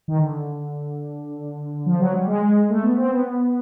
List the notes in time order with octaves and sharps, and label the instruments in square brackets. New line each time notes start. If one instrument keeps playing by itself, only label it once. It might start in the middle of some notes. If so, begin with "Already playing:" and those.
[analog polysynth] D#3
D3
F3
F#3
G3
G#3
A3
B3
C4
B3